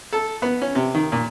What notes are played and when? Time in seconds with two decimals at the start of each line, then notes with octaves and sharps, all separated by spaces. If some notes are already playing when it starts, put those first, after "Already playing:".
0.13 A4
0.42 B3
0.62 C#4
0.75 C3
0.95 D#3
1.12 A#2